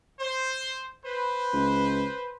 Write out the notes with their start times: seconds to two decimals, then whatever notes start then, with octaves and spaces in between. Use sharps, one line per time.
0.20 C5
1.06 B4 C5
1.53 C#2